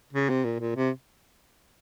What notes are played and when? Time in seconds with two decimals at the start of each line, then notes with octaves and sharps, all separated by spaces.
0.13 C#3
0.30 C3
0.45 A#2
0.60 A#2
0.76 C3